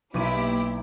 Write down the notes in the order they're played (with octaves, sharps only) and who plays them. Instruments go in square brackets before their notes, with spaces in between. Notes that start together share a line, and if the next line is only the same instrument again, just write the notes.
[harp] B1 D6 D#7 [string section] A#3 E4 G4